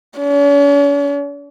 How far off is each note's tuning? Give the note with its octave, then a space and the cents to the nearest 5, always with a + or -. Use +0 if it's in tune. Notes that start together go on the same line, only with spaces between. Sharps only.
C#4 +45